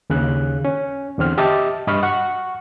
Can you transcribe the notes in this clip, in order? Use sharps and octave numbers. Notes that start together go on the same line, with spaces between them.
D#2 C#3 F#6
C#4
E2 D3 C4 F6
G4 D#5 E5 A5
G2 D#5 B5 C#6 F6
F#5 C#6